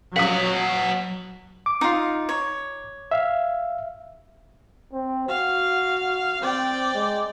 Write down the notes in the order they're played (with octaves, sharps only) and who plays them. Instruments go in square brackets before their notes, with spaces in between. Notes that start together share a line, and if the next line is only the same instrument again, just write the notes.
[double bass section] F#3 [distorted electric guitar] D#5 F#5 [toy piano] F5 D#6
[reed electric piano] D6
[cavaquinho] D#4 F4
C#5
[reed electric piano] E5 F5
[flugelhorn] C4
[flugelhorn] F#4 [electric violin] F5
[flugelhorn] C4 [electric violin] D5 G5
[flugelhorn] G#3